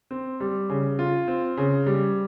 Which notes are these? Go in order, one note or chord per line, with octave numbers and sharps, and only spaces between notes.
C4
G3
C#3
F4
C4
C#3
G3